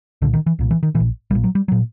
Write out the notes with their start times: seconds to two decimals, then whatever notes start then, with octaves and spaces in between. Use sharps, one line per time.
0.22 C2 A#2 D3
0.34 D#3
0.46 E3
0.59 C2 A#2
0.71 E3
0.83 D#3
0.95 A#2 E3
1.00 A#1
1.31 A#1 G3
1.35 A#2
1.44 F#3
1.55 G3
1.68 A#2 F#3